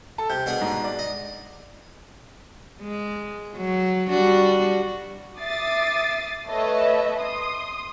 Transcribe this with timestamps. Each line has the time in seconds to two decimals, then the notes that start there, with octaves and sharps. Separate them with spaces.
0.18 A4 A5
0.30 C3 G6
0.46 B2 D4 G#4
0.61 G#2
0.84 D5
0.99 D#5
2.81 G#3
3.56 F#3
4.09 G3 D4 F#4
5.38 E5 D6 D#6 A6 C7
6.47 A3 B4 C#5 D#5 E5 A5
7.19 C6 D#6